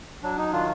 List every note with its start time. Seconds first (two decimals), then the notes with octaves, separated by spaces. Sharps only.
0.23 F#3 D4
0.38 D#4
0.52 D#3 D4 F4